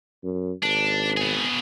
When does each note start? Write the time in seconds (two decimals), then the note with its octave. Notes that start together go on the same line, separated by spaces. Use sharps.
0.24 F#2
0.63 G#1 D4
1.17 B2 G#4